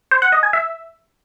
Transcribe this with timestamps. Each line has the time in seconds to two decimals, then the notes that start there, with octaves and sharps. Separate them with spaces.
0.11 C5
0.22 F#5
0.32 D#5
0.43 G#5
0.53 E5